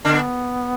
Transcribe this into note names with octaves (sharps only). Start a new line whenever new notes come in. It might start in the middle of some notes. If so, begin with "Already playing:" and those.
D3 B3 D4